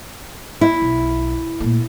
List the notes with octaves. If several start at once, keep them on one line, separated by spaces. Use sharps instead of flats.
E4
B1
A#2 A3